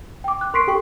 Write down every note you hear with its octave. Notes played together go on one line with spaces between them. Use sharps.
G5 D6
F#6
A#4 C6 C#6 B6 C7 D7
G4 A4 G5 C#6